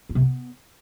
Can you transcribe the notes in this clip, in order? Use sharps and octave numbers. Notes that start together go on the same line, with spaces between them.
F4
C3
B3